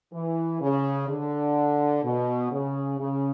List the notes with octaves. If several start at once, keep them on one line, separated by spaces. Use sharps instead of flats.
E3
C#3
D3
B2
C#3
C#3